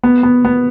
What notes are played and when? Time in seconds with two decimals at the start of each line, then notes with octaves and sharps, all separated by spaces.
0.03 B3
0.23 B3
0.45 B3